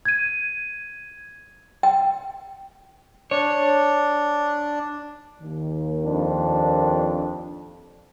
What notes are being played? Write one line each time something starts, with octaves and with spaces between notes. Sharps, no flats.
G#6 D#7
G5
D4 C#5
D#2 D#3
F2 D4